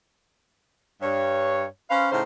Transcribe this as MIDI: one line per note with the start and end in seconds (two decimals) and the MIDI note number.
1.02 1.65 43
1.02 1.65 73
1.90 2.09 61
1.90 2.09 71
1.90 2.09 72
1.90 2.09 77
2.12 2.22 45
2.12 2.22 49
2.12 2.22 63
2.12 2.22 72
2.12 2.22 77